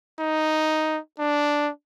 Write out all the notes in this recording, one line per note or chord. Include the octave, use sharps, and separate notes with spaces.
D#4
D4